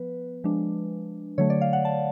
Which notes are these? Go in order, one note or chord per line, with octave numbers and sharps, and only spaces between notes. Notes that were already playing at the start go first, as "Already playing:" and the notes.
Already playing: F3 B3 B4
F3 G#3 D4
D3 F#3 A3 C#5
D5
F5
F#5
A5